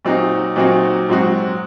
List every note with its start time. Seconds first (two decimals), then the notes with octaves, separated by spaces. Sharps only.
0.05 A#2 F#3 C4 D#4 F#4
0.56 A#2 F#3 C4 D#4 F#4
1.09 G#2 F#3 C4 F#4